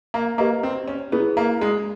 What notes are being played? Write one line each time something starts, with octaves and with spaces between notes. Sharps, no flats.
A#3
A#3 G4 B4 D#5
C4
C#4
B3 E4 G#4 B4
A#3
G#3